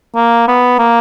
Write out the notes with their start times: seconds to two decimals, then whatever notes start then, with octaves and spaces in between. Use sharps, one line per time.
0.16 A#3
0.48 B3
0.79 A#3